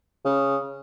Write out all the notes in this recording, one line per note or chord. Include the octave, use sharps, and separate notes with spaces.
C#3